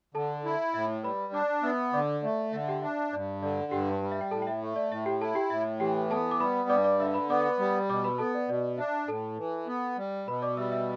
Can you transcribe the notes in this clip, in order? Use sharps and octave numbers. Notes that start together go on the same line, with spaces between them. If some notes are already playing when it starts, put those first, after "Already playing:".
D3 A4 A5
E4
A2 E5
G3 B4 B5
D4 D5 D6
B3 E5 E6
D3 D5 D6
A3 D5
D3 E5
E5
G4 G5
D4 E5
E5
G2 D5
D3 D5
G2 G4 G5
G3
E5
G5
A2 A4 A5
G5
E5
A3
D5
A2 E5
G4 G5
E4 A4 A5
G4 G5
A2 E5
E3 G4 G5
B3 A4 A5
D6
G3 B4 B5
G2 D5 D6
D5 D6
D3 E5 E6
B4 B5
B3 D5 D6
G3
B2 D5 D6
B4 B5
B3 A4 A5
D5
B2 D5
D4 E5
A2 A4 A5
E3
B3
G3
B2 B4 B5
D5 D6
G3 E5 E6
E5 E6